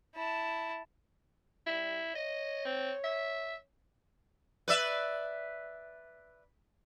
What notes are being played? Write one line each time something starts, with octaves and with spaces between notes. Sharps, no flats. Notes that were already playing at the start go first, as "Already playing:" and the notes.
E4 A5
G3 E4
C#5 D#5
C4
E5
B4 D5 E5